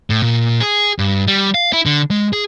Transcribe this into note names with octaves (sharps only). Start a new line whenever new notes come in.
A2
A#2
G#4
G2
G3
F5
E4
D3
G#3
G#4